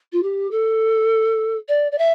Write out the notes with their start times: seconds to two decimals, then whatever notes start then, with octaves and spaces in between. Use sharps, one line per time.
0.12 F4
0.23 G4
0.51 A4
1.68 D5
1.91 D5
1.98 E5